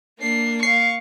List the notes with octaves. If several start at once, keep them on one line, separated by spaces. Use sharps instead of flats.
A#3 D4 C7
F5 C#6 C7